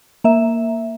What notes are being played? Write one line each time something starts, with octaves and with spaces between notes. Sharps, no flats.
A#3 E5